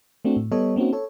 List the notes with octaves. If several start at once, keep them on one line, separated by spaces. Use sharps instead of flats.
A3 C4 D4 F#4
A2
G3 B3 A4 C#5 D#5
A#3 C4 C#4 D#4 F#4
A4 C#5